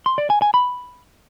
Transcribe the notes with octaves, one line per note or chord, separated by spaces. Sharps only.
C6
D5
G#5
G#5
B5